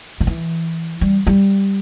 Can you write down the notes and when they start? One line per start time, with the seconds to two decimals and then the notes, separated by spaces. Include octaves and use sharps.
0.21 D3
0.27 E3
1.01 G3
1.27 G3